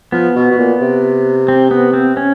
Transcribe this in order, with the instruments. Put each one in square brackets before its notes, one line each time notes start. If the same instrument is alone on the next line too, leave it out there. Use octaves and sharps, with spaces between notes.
[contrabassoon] F3 [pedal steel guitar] B3
[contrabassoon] B2
B2
A#2
C3
[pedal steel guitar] C4
B3
C4
C#4